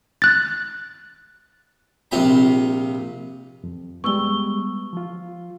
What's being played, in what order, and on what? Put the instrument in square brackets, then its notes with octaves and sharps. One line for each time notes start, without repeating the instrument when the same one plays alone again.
[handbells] F#6 A6
[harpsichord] A#1 C3 F4 G5 A#5 B5
[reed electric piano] F2
[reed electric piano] G3 G#3 B3 [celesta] C#6 E6 G7
[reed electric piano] F3 F4